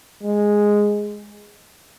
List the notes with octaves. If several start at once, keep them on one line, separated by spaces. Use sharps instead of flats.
G#3